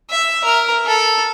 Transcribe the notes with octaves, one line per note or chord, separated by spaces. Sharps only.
E5
A#4
A4